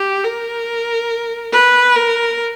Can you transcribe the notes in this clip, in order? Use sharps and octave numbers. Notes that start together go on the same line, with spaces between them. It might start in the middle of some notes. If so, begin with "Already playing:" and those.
Already playing: G4
A#4
B4
A#4